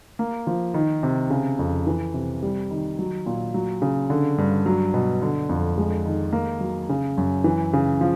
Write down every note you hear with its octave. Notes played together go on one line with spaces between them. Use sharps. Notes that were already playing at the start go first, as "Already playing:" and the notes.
A#3
F3
D#3
C3
C#3
F2
E3
C3
G3
D#3
F#3
A#2
F#3
C#3
D3
G2
F#3
B2
D3
F2
G#3
D#3
A#3
F#3
C#3
F#2
E3
C#3
F3